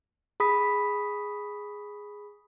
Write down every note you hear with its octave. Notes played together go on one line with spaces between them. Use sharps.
G#4 B5 D#6 B6